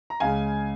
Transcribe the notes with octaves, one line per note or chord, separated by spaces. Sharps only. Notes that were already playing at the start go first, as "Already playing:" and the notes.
A#5
C#2 C#3 G#3 F5 G#5